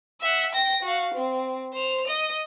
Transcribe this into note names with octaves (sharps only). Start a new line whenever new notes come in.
E5 F#5
G5 A#6
F#4 F5
C4
C5 F7
D#5